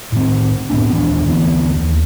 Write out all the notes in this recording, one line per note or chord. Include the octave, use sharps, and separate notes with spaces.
A2 D#3 C4
A2 B3 C4 D4
D#1 D#2 E3 D4
D2 E3 B3
D#2